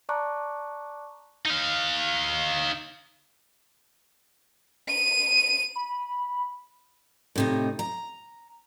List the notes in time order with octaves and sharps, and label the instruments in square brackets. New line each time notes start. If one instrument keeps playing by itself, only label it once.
[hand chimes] D5 A5 A#5 C#6 D6 F#6
[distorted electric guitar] D#4 F5
[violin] D#7
[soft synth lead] B5
[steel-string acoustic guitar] A2 C3 D#4
A#5